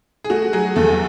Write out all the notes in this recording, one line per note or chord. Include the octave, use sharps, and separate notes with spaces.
G#4
A3 F#4
F#3 G#4
E2 A4